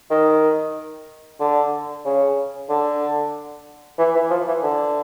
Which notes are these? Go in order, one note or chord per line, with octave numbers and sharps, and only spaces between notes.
D#3
D3
C#3
D3
E3
E3
F3
E3
D3